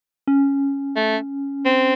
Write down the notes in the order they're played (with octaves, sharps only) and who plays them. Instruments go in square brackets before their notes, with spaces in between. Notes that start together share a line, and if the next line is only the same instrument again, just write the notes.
[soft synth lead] C#4
[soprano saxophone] A3
C4